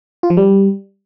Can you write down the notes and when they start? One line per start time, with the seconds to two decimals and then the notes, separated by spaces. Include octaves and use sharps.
0.23 F4
0.30 F3
0.37 G3